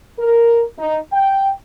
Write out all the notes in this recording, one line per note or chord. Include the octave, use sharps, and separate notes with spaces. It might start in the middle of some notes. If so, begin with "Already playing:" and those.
A#4
D#4
G5